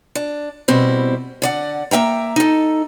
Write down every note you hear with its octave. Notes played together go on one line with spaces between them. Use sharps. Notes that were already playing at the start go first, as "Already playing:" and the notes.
D4
B2 G3 C4 E4
D3 D5 F#5
A#3 E5 G5 A#5
D#4 A4